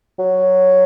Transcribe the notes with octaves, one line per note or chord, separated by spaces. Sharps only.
F#3